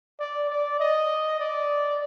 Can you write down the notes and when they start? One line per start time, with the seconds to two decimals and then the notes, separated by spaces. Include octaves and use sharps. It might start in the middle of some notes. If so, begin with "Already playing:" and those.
0.20 D5
0.50 D5
0.80 D#5
1.40 D5